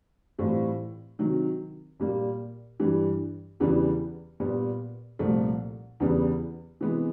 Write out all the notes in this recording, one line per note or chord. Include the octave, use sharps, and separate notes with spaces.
A2 E3 G3 C4 F4
C3 D#3 F#3
A#2 G3 A#3
G2 E3 G3
E2 C#3 E3 G3 B3
A#2 G3 B3
C2 A#2 F3 A3
E2 C#3 E3 G3 B3
C3 E3 G#3 B3